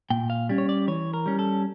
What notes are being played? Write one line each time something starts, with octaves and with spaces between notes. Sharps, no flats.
A#2 G5
F5
G3 C#4
C#5
D5
E3 C#5
A#4
G3 C#4
A4